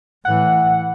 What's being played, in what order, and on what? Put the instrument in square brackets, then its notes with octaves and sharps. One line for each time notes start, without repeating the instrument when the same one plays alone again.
[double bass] A2 E3 [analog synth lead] F#5